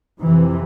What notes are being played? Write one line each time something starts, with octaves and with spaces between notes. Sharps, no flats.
F2 C3 E3